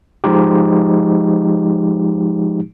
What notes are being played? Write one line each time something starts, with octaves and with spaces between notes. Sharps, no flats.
F3 G#3 D#4 G4